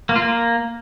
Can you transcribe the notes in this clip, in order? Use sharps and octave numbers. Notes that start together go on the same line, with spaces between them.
A#3
F4
A#3